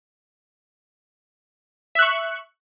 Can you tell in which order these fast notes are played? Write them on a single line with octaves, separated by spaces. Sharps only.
E5 F#6 C#6